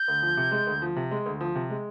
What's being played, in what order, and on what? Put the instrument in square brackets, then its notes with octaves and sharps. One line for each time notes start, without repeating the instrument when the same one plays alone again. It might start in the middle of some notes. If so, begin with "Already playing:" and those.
Already playing: [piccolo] G6
[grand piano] D2
F3
C3
G#3
D2
F3
C3
G#3
D2
F3
C3
G#3